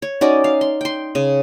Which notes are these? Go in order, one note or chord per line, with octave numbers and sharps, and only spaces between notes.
C#5
C#4 D#4 F#4 D5
F5
C6
G5 C6
C#3